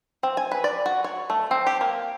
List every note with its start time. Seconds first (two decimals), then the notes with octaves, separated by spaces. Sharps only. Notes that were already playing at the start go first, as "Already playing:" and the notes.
0.23 C4
0.37 G#5
0.51 B4
0.64 D5
0.86 F#4
1.04 C#5
1.30 A3
1.51 C4
1.67 G4
1.81 A#3